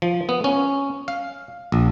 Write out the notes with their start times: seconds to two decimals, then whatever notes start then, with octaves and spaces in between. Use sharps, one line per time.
0.02 F3
0.29 B3
0.44 C#4
1.08 F5
1.72 A#1